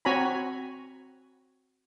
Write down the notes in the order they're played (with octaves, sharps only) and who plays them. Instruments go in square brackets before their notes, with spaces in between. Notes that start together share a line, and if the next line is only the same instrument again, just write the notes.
[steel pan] C4 F#4 C#5 G#5 A#5 B5